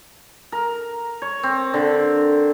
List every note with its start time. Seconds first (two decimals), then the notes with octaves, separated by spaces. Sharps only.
0.52 A#4
1.22 C#5
1.43 C4
1.74 D3